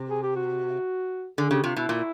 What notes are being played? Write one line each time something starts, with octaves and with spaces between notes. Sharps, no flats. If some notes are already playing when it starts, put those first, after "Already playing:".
Already playing: C3
G#4
G4
F#4
D3 G#4
C#3 G4
C3 F4
B2 E4
A#2